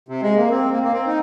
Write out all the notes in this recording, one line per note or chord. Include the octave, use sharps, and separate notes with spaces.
C3
G#3
A#3
C4
A#3
A#3
C4
D#4